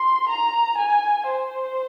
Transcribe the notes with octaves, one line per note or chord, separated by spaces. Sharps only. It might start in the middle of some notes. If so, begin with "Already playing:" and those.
Already playing: C6
A#5
G#5
C5